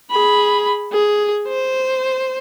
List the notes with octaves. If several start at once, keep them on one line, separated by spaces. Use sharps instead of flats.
G#4 B5
G#4
C5